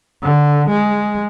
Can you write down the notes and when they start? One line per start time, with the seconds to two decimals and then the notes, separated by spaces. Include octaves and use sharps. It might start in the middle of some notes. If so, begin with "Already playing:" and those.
0.23 D3
0.69 G#3